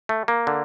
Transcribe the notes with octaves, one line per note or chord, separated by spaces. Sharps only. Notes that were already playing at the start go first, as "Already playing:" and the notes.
A3
A#3
D3